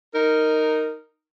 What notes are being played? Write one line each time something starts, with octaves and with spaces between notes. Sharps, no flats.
D#4 A#4